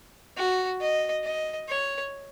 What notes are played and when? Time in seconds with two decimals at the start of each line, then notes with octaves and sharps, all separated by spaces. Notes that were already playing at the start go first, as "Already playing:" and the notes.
0.37 F#4
0.81 D#5
1.24 D#5
1.68 C#5